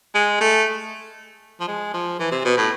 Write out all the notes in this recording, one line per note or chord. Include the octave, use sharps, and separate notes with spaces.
G#3
A3
F3
G#3
F3
E3
C3
B2
A2